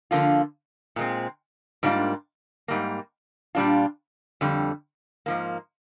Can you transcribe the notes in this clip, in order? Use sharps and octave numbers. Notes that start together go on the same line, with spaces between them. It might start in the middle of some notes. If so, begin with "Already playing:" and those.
D3 F3 A#3 F4
A#2 G#3 C4
G#2 G3 A#3 D4 F4
G#2 G3 A#3
A#2 G3 D4 F4
F2 D3 G3
G#2 F3 A#3